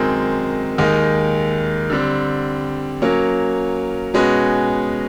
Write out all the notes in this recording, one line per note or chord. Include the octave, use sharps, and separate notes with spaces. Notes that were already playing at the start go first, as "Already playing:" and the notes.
Already playing: F#2 D#3 G#3 C4
D#2 D#3 G#3
D3 G3 C4
F#3 A#3 C#4
B2 G#3 C#4 F#4 B4